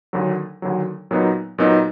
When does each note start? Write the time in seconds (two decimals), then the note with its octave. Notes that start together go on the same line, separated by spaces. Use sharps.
0.13 D#2 D3 F#3
0.62 D#2 D3 F#3
1.11 A#2 F#3 B3 D#4
1.58 A#2 F#3 B3 D#4